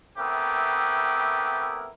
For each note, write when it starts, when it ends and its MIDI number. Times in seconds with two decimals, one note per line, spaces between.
0.17 1.89 57
0.17 1.89 59
0.17 1.89 60
0.17 1.89 64
0.17 1.89 67
0.17 1.89 70